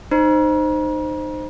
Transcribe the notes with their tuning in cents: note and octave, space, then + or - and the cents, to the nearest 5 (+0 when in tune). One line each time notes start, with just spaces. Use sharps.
D#4 -25 C5 +0 A#5 +40